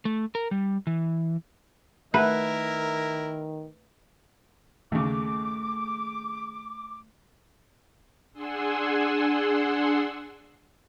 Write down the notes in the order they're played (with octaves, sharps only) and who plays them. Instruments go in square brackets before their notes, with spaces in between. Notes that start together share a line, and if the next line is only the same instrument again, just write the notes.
[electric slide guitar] A3
A#4
G3
E3
[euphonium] D#3 [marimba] A3 E5 F#5 [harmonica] E4 A#4 [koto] B4
[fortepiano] D#2 C#3 [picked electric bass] A3 [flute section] D6
[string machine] D4 G#4 F#5 G#5 C6 E6